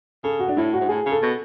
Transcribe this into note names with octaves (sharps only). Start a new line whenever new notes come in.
C#3 A4
F#4
D4
A2 E4
F#4
G#2
A2 G#4
C#3
A4
B2